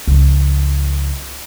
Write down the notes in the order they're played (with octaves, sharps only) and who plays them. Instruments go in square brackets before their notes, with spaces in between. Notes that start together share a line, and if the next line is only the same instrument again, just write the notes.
[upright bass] C#2 F3